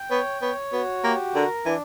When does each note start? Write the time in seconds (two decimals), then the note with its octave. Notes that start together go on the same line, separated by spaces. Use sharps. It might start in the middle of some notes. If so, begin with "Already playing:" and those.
Already playing: G5
0.10 B3 C#5
0.42 B3 C#5
0.72 B3 F#4
1.04 A#3 G4
1.35 D3 A#4
1.66 E3 D4